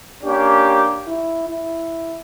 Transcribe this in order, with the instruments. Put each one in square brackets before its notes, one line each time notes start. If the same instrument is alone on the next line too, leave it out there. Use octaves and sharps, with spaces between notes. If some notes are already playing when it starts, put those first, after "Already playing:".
[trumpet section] A#3 C#4 G4 [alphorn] D4
[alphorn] E4
E4